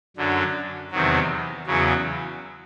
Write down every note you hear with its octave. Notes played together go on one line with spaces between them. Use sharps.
F#2 D3 F#3
E2 C3 D#3 F#3
E2 C#3 F#3